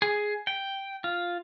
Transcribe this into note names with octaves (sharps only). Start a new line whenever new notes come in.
G#4
G5
F4